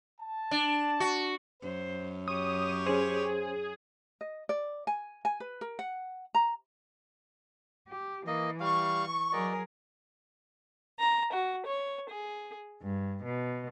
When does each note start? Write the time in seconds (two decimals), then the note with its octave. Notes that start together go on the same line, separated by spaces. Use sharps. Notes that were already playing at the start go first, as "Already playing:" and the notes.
0.21 A5
0.51 D4
1.00 F#4
1.62 F#2 C5
2.28 G4 C#5 D#6
2.86 C#4 G#4 C5
4.21 D#5
4.49 D5
4.87 G#5
5.25 G#5
5.40 B4
5.61 A#4
5.79 F#5
6.35 A#5
7.88 G4
8.27 E3 A#3 D#5
8.60 G3 F5 C#6
9.32 F#3 F#4 G#4 A#4 D5 D#5
11.00 A#5
11.32 F#4
11.65 C#5
12.08 G#4
12.83 G2
13.25 B2